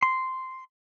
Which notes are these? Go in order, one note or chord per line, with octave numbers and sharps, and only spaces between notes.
C6